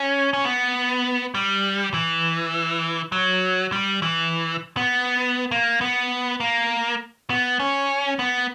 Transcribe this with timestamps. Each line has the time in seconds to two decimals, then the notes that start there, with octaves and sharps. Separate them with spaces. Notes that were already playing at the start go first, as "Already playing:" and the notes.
Already playing: C#4
0.33 C#4
0.44 B3
1.35 G3
1.94 E3
3.12 F#3
3.72 G3
4.02 E3
4.77 B3
5.51 A#3
5.81 B3
6.40 A#3
7.30 B3
7.60 C#4
8.19 B3